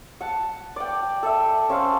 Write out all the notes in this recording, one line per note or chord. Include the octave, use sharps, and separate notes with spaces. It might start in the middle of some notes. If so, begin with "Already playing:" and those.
F#5 A5
D5 G5
A4 E5
C#4 A4 C5 F5